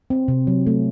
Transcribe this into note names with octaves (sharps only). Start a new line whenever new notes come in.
C4
C3
F#3
A3